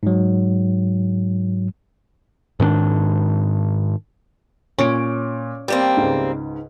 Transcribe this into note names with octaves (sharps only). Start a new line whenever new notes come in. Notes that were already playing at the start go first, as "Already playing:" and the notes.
G#2 F#3
G#2 D#3 C4 D4
A#2 C#4 D7
G3 A#3 C4
C#2 G#2